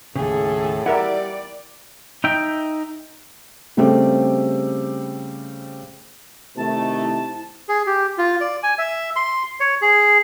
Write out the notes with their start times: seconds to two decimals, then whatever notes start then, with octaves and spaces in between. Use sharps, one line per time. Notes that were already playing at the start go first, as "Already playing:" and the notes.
0.16 D#2 A2 C#3 G#4 A4
0.86 G3 E4 A#4 D5 E5 F#5
2.24 D#4 E5 G5
3.77 C#3 G3 A3 C4 G4
6.57 C3 D#3 A3 E4 A5
7.69 G#4
7.87 G4
8.18 F4
8.41 D5
8.63 G#5
8.78 E5
9.16 C6
9.60 C#5
9.82 G#4